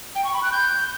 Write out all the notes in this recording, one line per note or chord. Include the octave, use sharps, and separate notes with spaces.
G5
C#6
B5
F#6
G6